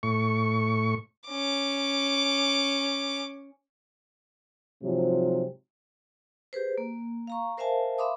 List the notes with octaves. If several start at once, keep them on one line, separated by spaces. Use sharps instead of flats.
A2 C#6
C#4 D6
G#2 C3 F3 F#3
G4 G#4 B4 C5
A#3
F5 A#5 C#6
A#4 C5 E5 F5 G#5 A5
E5 F5 B5 C6 D6 D#6